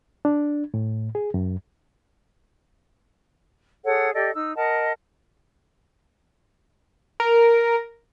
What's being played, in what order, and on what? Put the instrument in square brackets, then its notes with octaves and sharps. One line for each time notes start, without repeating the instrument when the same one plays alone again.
[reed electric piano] D4
A2
G#4
F#2
[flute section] G#4 A4 C#5 F#5
G4 A4 D5 D#5
D#4 E6
A#4 D#5 F#5 A5
[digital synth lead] A#4